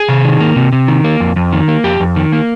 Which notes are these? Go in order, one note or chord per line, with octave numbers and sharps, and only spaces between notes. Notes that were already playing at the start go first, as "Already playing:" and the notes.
Already playing: G#4
C3
D#3
A#3
C3
C3
D#3
A#3
F2
F2
D#3
A#3
F2 G4
F2
D#3
A#3